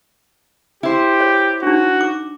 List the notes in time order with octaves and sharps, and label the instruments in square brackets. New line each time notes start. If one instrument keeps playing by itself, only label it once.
[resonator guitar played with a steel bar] E4 C5 [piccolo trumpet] G4
[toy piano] C#5
[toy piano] D4 D#4 [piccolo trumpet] F#4
[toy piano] D6